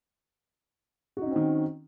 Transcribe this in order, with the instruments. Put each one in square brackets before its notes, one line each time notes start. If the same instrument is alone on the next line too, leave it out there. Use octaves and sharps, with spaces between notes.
[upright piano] F#4
D#4
C#4
C4
D#3